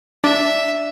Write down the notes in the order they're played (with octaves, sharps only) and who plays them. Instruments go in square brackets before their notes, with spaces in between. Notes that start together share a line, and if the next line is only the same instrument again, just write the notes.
[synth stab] D4 [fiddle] E5